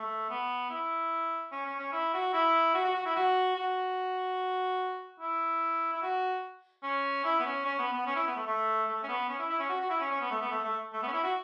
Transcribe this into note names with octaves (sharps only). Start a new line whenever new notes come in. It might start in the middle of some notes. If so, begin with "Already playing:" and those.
Already playing: A3
B3
E4
C#4
C#4
C#4
E4
F#4
E4
F#4
F#4
F#4
E4
F#4
F#4
E4
E4
F#4
C#4
E4
B3
C#4
C#4
B3
B3
C#4
E4
B3
A3
A3
A3
C#4
B3
C#4
E4
E4
C#4
F#4
F#4
E4
C#4
C#4
B3
A3
B3
A3
A3
A3
B3
C#4
E4
F#4